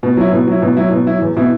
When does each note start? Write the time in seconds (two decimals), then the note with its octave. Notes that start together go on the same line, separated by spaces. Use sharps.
0.03 B2
0.17 F#3 E4
0.32 B2
0.47 F#3 E4
0.62 B2
0.77 F#3 E4
0.92 B2
1.07 F#3 E4
1.22 E2
1.36 B2 B3 E4